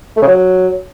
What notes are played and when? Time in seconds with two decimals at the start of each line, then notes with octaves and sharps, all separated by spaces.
0.17 A3
0.22 C#3
0.27 F#3